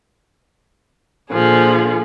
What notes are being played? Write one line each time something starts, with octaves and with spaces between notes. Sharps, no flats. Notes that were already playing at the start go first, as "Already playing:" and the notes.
A#2 D3 F3 G#4